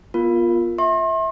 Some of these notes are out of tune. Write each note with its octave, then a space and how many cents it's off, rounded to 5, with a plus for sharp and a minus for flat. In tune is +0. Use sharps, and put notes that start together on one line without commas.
B3 -30 F4 +0 A#4 +0
E5 -20 C6 +40